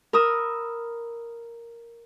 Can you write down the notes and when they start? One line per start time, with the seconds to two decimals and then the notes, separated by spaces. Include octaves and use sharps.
0.13 A#4 B5 D#6 E6